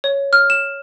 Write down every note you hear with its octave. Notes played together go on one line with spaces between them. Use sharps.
C#5
F6
E7